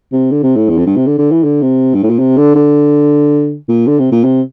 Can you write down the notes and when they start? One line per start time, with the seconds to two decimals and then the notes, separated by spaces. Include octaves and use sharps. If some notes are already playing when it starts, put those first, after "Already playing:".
0.12 C3
0.31 D3
0.43 C3
0.56 A2
0.69 E2
0.78 F2
0.86 G2
0.96 C3
1.06 D3
1.18 D3
1.31 E3
1.44 D3
1.62 C3
1.94 G2
2.03 A2
2.10 A#2
2.19 C3
2.37 D3
2.55 D3
3.69 A#2
3.87 D3
3.99 C3
4.12 A#2
4.24 C3